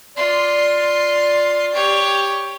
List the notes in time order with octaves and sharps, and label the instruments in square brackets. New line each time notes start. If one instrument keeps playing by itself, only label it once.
[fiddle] F4 C6 [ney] D5
[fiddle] G4 C#5